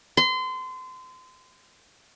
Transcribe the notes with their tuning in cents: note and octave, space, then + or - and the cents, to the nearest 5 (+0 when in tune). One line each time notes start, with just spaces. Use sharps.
C6 -30